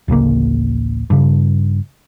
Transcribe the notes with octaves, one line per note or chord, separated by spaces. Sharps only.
D1 A1 C#3 A#3
G2 C#3